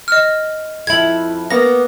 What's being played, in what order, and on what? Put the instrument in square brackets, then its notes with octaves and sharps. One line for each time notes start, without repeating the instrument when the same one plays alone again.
[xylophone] D#5 F6
[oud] F2 E4 [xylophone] G#6 F#7
[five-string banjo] A#3 B3 [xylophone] A#6